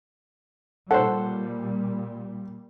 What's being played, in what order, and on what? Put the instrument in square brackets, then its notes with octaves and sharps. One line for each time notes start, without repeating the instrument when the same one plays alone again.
[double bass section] A#2 G3 [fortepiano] A4 C5 [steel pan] C#5 F#5